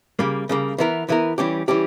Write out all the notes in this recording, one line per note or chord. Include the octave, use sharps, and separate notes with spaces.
C#3 G3 A#3
C#3 G3 A#3
E3 B3 E4 A#4
E3 B3 E4 A#4
E3 G3 C#4 G4
E3 G3 C#4 G4